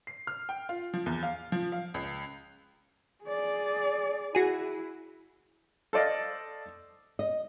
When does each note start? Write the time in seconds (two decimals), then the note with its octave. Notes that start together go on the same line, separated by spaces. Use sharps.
0.07 C7
0.27 F6
0.49 G5
0.69 F4
0.94 F3
1.06 E2
1.23 F5
1.52 F3
1.72 F5
1.94 C#2
3.24 G#4 D5
4.35 E4 F#4 G#4
5.93 A4 C5 D5 D#5 F5
7.19 D#5